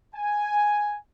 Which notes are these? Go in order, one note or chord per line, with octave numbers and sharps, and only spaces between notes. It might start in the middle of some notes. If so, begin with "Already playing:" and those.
G#5